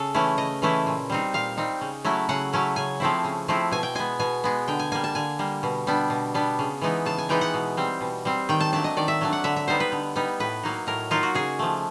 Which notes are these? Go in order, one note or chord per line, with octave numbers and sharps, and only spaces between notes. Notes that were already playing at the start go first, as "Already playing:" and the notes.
Already playing: C#3 A4
E3 A3 C#4 E4
C#3 D#5
E3 A3 C#4 E4
A#2
G3 C4 D#4
A#2 F5
G3 C4 D#4
C#3
F#3 A3 C#4 E4
C#3 F#5
F#3 A3 C#4 E4
C#3 G#5
F3 A3 C4 E4
C#3
F3 A3 C4 E4
B2 G#5
G5
G#3 B3 G#5
B2 G#5
G#3 B3
D3 G5
G#5
G3 A#3 G#5
A5
D3 G#5
G3 A#3
B2
G3 B3 D4
B2
G3 B3 D4
C#3
E3 G#3 B3 D#4
C#3 A5
G#5
E3 G#3 B3 D#4 G5
F#5
B2
G3 C4
B2
G3 C4
D#3 G5
A5
F#3 A3 D4 A5
D#5
D#3 D5
E5
F#3 A3 D4
F#5
D3 E5
E5
G3 B3 D#4 C5
B4
D3
G3 B3 D#4
A2 B4
F#3 A#3 D#4
A2 A#4
F#3 A#3 D#4 F4
F#4
C#3 G#4
F3 A3